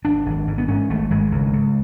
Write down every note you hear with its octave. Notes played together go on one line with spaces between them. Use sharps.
G#1 D4
G#1
G#2
B3
G#2 C#4
G#1 A3
G#1 G#3
C#2
C#2